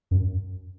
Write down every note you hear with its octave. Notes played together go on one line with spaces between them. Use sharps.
F#2